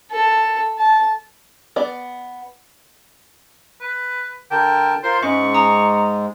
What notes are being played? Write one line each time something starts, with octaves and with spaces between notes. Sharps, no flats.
A4
A5
B3 D5
B4
D3 A#4 G5 A5
F4 A#4 C5 C6
G#2 G#3 C#4 E5 C#6
A#5 D#6